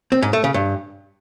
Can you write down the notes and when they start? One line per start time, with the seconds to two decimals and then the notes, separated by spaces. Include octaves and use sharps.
0.12 C4
0.22 G#2
0.33 A3
0.44 C#3
0.54 G2